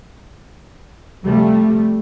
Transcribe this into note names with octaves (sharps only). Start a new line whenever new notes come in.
C3 F3 G3 A3